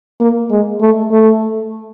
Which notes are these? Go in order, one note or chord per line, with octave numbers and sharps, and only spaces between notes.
A#3
G#3
A3
A3